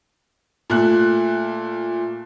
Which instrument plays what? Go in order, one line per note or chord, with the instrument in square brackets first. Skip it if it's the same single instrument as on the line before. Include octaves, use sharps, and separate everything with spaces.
[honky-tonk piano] A#2 A3 F#6